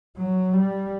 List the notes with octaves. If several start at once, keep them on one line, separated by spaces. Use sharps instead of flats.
F#3
G3